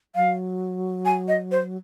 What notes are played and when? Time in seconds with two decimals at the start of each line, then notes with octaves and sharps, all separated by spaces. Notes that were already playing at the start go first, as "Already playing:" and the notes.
0.16 F#3 F5
1.05 G#5
1.28 D#5
1.51 C5